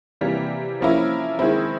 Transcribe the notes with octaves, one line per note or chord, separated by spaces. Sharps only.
C3 E3 G3 A#3
F3 A#3 C#4 E4
D#3 G#3 C4 E4